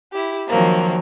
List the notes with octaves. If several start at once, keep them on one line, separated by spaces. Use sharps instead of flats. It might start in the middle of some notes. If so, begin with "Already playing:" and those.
E4 G4
D#3 F3 F#3 A#3 C4